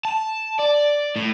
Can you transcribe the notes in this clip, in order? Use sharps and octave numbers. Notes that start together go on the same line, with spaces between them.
A5
D5
A2